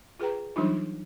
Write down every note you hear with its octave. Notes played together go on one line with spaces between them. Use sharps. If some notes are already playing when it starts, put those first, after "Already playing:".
F4 G#4 B4 G5 A#5
E3 F#3 G3 D4 D#4 F4